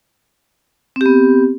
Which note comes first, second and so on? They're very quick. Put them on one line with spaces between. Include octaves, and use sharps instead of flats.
C4 G4 B3